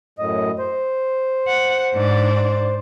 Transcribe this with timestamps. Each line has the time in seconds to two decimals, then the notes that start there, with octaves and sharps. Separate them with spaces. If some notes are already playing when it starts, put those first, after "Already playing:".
0.19 F#2 A2 D#5
0.59 C5
1.48 F#5
1.93 G#2 D4